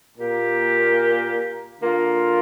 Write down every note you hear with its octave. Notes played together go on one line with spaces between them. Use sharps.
A#2 A#3 G4 A#4
D3 A#3 F4